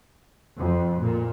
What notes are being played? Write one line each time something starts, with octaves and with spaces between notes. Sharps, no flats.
F2
A#2